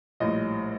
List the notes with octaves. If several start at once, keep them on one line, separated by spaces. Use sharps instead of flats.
A#1 A2 G3 D#5